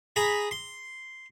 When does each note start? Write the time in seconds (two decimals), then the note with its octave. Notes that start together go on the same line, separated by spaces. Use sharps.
0.16 G#4 A#5 B5
0.51 C6